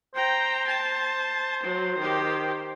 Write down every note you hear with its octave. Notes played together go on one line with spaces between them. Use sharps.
C5 G5 A#5
A5
F#3
D#3 G4